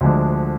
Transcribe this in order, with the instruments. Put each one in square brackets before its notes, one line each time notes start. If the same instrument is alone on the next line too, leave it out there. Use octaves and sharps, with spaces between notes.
[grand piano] D2 D3 F3 G#3 D4